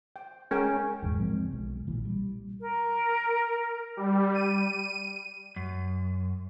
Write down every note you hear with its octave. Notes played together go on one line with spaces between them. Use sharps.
G5
G#3 C#4 A#4 G5
A#1 E2 G#2
C#3 F3 G#3 C4
B1
B1 A#2 E3
G3
A#4
G3
D#7
F#2